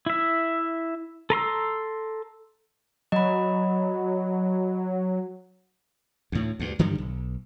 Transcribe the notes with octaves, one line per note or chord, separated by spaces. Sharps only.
E4 E5
A4 A#5 C6 E6
F#3 D#5 B5
D2 A2
D2 G2
G2 D3 D#3 G3
B1